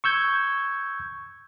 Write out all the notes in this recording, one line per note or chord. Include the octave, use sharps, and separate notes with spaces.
C#6 E6 G6 G#6